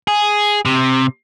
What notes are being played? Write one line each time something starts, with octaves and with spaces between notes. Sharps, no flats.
G#4
C3